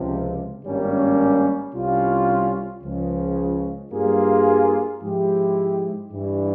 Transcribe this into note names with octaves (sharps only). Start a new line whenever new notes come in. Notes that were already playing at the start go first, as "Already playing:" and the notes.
Already playing: C#2 C3 F3
G#1 G2 G3 A#3 C#4
C2 C3 G3 C#4 F4
C#2 C#3 F3
G2 G3 A#3 F4 G#4
G#2 F3 G#3 E4 G4
G2 E3 G3